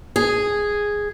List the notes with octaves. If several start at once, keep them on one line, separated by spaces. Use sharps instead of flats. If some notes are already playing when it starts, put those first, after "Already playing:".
G#4